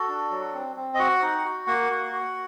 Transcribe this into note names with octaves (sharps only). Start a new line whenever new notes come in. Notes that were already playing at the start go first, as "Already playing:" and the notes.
Already playing: F#4 A4
D4
F#3
C4
C4
D#5
F#4 F#5
D#4
F#4
A#3 F#5
F#4
F#4